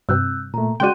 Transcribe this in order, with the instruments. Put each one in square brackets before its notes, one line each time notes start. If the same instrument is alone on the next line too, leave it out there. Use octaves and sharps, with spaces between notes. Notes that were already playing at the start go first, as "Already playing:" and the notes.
[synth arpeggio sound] G2 C3 [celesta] E6 F#6 G6
[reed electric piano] A#2 A3 [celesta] A#5
[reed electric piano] C#3 G#3 D5 [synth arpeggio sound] F#4 G5 [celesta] C6 F#6 D#7